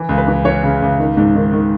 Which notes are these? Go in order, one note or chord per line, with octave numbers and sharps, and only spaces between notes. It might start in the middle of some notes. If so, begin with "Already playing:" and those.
Already playing: E3
C#2
B4
E3
E3 C#5
C#3
C#2
D#3
G#2
D#3
D#3